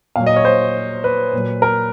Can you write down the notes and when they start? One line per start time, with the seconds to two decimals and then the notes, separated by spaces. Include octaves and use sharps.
0.16 A#2 F#3 F5
0.26 D#5
0.36 C#5
0.45 C5
1.04 B4
1.33 A#2 F#3
1.62 A#4